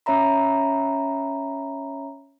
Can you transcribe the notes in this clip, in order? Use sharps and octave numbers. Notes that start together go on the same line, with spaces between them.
C#4 C#5 E5 A#5 B5